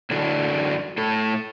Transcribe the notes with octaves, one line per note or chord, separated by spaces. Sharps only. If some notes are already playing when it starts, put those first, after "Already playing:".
F#2 D3 D4 E4 F#4 A4
A2 A4